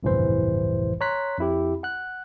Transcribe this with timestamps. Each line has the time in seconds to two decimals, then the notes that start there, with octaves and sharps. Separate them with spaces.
0.03 G1 C2 F2 A2 E3 C5
1.01 C#5 A#5 C6 F#6 B6
1.39 F2 E4 G4
1.83 F#5 F#6